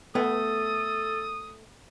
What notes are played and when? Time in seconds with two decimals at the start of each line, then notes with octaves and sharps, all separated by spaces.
0.15 A3 B3 A4 D#6